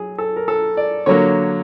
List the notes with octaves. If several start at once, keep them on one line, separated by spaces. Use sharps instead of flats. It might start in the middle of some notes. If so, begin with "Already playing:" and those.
Already playing: F#3 G#4
A4
A#4
A4
D5
D3 F#3 A#3 C#5